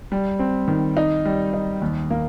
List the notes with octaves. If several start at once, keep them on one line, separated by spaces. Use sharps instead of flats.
G3
C4
D#3
D#4
G3
D#4
D#2
A#3